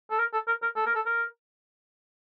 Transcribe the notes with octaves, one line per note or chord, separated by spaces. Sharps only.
A4
A#4
A4
A#4
A#4
A4
A#4
A4
A#4